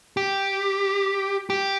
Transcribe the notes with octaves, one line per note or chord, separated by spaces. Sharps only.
G4
G4